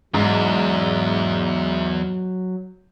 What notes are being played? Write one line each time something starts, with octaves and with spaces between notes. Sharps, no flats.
E2 G#2 F#3